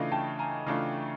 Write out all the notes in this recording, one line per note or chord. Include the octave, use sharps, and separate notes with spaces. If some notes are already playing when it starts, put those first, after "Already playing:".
Already playing: C#3 E3 A3 D4 F4 D#5 F5
G5 A5
G#5 A#5
C#3 E3 A3 D4 F4